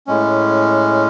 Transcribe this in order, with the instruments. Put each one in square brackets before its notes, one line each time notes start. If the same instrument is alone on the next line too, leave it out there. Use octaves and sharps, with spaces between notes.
[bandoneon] A2 G#3 C#4